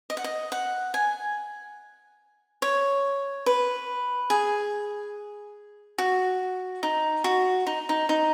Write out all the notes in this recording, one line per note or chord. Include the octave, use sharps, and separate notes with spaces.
D#5
F#5
D#5
F#5
G#5
C#5
B4
G#4
F#4
D#4
F#4
D#4
D#4
D#4